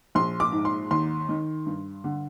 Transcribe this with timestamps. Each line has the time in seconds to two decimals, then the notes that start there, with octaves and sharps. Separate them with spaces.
0.15 A#1 C6
0.40 D6
0.52 G#2
0.65 C6
0.91 D#2 C6
1.29 D#3
1.66 G2
2.04 D3